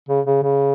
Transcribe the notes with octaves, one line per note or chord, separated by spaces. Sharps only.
C#3
C#3
C#3